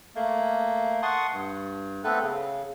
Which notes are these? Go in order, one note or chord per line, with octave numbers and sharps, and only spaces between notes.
A3 A#3
F#5 A5 C6 C#6 D#6
G2
A3 B3 C4 A4 B4
C#3